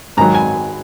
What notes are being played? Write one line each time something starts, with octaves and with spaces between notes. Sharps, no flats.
G#2 D#3 F#3 A#5
G#5